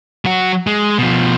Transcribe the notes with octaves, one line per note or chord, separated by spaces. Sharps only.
F#3 F#4
G#3
B2 F3